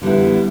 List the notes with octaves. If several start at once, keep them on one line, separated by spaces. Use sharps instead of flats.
D3 G3 B3 E4